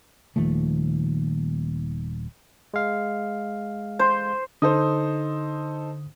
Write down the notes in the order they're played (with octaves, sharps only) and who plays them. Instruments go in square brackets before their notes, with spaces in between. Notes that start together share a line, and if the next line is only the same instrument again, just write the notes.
[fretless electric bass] D#1 D#2 F3 A3
[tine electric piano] G#3 F5
[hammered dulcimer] C5
[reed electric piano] D3 D#6 [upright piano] D#4 A4 C5